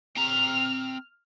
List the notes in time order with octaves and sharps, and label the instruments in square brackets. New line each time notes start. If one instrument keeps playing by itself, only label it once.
[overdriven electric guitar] C4 A#5 [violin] F6 F7